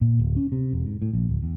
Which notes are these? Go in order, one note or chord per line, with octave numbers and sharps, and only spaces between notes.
A#2
D1
C#4
C3
E1
G#2
A2
A#1
D1
E2